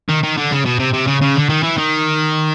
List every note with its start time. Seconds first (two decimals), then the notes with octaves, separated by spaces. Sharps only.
0.09 D#3
0.23 D#3
0.37 D3
0.52 C#3
0.65 B2
0.79 C3
0.93 C3
1.07 C#3
1.21 C#3
1.36 D3
1.49 D#3
1.63 E3
1.78 D#3